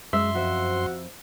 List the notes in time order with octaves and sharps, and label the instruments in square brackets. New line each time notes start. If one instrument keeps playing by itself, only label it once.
[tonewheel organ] F#2 C6 [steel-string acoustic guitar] G#3 [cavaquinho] E5
[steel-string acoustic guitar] F2 C5 [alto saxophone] F#4